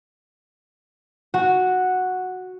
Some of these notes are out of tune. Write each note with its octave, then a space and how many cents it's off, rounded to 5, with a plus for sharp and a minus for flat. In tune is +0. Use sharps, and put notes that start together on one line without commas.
F#4 -5